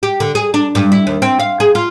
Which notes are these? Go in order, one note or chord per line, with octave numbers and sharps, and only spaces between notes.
G4
D3
G#4
D4
G2
E4
D#2
C4
F5
G#4
F4